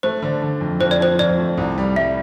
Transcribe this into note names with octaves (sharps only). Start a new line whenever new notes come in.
A3 C5
D3
D3
F2
F2 C5
D5
F3 C5
F2 D5
A3
C2
G3
G3 E5